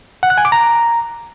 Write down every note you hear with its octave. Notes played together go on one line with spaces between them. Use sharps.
F#5
F#6
G#5
D6
A#5